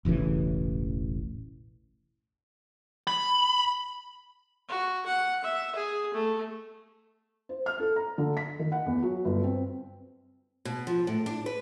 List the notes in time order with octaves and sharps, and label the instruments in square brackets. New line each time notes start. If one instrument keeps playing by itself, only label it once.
[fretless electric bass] E1 A1 C#3 E3
[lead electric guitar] B5
[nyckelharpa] F#4
F#5
E5
G#4
A3
[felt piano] C5
F6
A4
A#5
D3
B6
D#3
F#5
E2
F#3
G1
C4
[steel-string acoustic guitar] B2
F3
A2
D4
B4